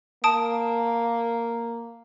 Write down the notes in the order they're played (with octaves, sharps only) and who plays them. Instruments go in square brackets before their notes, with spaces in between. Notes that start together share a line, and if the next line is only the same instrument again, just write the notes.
[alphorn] A#3 [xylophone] A5 D#6 D7